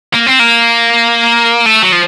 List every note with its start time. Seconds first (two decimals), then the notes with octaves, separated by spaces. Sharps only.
0.13 A#3
0.26 C4
0.39 A#3
1.66 A3
1.82 F#3
1.92 F3